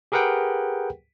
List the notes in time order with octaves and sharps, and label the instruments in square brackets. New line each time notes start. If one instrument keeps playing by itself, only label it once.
[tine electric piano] G4 G#4 A#4 B4 F#5 G5